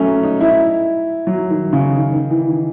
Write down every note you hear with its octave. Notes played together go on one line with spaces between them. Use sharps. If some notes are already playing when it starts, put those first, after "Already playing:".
Already playing: F#3 A3 C#4
D#4
E4
F#3
D#3
C#3
D#3
D#3
E3
D#3